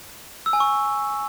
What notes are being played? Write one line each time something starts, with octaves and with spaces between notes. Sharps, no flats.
E6
G#5
C#6